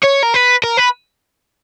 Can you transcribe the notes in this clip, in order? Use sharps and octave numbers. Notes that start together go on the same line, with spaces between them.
C#5
A#4
B4
A#4
B4